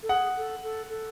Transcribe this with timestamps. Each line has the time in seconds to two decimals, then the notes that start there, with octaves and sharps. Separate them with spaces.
0.03 A4
0.09 G#4 F#5
0.37 A4
0.63 A4
0.90 A4